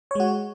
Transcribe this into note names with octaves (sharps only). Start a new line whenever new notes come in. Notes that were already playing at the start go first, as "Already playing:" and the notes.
G#3 F#4 C#5